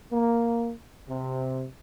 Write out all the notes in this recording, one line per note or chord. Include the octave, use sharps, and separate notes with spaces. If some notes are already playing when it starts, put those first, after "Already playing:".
A#3
C3